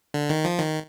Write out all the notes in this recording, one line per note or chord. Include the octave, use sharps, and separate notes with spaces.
D3
D#3
F3
D#3